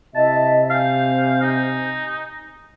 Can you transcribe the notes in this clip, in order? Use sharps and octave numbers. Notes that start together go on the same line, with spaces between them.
C3 E4 D#5 E5 A5
F5 G#5 G6
D#4